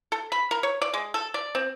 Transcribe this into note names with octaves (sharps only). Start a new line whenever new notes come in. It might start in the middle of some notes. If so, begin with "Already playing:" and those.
A4
B5
A#4
C#5
D5
G#3
A4
D5
C4